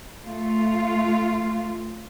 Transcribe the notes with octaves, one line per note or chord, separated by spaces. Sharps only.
A3 F4